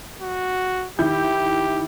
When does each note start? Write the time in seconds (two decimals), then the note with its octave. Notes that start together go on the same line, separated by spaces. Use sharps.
0.22 F#4
0.99 D#3 E4 G4 G6